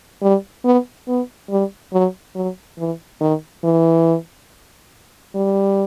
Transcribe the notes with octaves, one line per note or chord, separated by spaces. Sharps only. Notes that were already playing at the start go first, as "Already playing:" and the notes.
G3
B3
B3
G3
F#3
F#3
E3
D#3
E3
G3